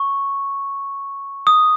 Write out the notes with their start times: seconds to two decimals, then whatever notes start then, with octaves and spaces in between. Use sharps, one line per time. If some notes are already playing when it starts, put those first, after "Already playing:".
Already playing: C#6
1.47 D#6